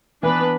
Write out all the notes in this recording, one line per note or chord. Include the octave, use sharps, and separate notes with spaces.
E3 B3 D4 B4